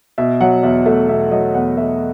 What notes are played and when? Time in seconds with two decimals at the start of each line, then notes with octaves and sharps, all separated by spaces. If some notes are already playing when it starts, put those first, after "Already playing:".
0.18 B2 E5
0.40 F#3 F#5
0.63 E2 E5
0.86 A3 E5
1.09 B2 E5
1.31 F#3 D#5
1.55 E2 F#5
1.77 A3 E5